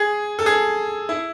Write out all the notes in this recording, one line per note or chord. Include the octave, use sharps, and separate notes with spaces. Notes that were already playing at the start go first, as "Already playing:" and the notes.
Already playing: G#4
A4
G#4
E4